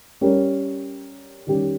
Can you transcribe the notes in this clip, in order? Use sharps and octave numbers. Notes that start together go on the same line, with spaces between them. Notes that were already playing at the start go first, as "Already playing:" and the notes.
G3 C#4 G4 A#4
D#3 G3 C#4 G4